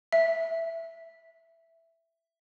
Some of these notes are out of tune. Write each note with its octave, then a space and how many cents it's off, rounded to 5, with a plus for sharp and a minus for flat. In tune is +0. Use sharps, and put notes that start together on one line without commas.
E5 +5